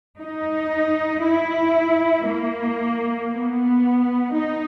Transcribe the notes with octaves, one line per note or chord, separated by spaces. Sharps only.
D#4
E4
A#3
B3
D#4